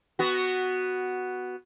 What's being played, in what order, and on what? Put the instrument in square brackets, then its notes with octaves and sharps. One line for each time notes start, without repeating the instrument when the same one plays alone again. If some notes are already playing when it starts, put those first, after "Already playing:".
[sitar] B3 F#4